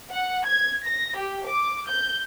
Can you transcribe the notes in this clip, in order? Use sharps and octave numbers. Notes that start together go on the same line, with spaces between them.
F#5
G#6
A#6
G4
D6
G6